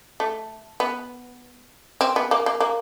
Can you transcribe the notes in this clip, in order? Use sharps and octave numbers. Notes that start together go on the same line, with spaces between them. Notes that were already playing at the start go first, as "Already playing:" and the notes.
A3
B3
C4
B3
A#3
A#3
A#3